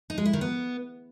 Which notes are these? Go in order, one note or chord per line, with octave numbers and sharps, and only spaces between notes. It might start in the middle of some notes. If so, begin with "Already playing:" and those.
D#4
G#3
E4
D#3
B3